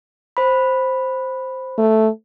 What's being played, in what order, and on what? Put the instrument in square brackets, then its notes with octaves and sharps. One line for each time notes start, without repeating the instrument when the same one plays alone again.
[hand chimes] C5 B5
[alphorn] A3